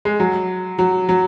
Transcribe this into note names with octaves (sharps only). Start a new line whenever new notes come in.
G#3
F#3
F#3
F#3